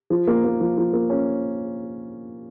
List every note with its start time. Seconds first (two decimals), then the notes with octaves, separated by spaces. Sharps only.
0.10 F3
0.27 A#3
0.44 A#3
0.60 F3
0.78 F3
0.93 A#3
1.10 C#4